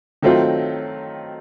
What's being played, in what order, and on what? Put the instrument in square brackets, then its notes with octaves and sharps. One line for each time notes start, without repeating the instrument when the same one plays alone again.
[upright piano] D#3 F#3 A3 C4 F4